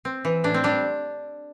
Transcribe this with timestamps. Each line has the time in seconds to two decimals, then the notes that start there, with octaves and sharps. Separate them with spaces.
0.05 C4
0.25 E3
0.44 A2 D4
0.54 C4
0.64 G3 D4